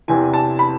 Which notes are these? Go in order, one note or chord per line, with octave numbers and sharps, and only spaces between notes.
E2 C3 E3 G#5
A5
B5